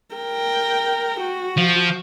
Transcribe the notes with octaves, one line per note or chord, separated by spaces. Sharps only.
A#4 G5
F#4
F3